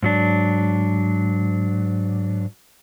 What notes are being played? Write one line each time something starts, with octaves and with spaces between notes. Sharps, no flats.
G#2 F#3 D4